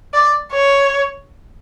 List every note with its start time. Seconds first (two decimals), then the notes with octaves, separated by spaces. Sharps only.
0.14 D5
0.52 C#5